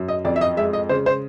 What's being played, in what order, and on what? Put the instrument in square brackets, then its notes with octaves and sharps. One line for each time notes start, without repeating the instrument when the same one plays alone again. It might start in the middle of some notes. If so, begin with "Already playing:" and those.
Already playing: [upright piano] F#2
D#5
F2 D5
E5
D#5
G#3 E5
D#5
C#3 C5
C5